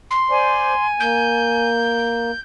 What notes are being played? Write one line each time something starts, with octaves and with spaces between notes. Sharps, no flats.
C6
C5 D5 G#5
A#3 G6